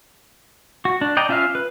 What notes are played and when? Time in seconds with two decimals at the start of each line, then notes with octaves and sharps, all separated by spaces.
0.85 F#4
1.01 D4
1.17 D5 D#5 G5 A#5
1.29 C#4 F4 E5 F5 F6
1.55 B4